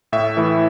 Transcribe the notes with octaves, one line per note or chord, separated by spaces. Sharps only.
A2 E5
E3 A3 E4